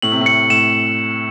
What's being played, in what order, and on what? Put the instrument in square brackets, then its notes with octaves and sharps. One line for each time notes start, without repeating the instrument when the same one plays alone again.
[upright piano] A2 [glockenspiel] F#7
[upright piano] C3
A2
[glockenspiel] C#7
[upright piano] A2 [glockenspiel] E7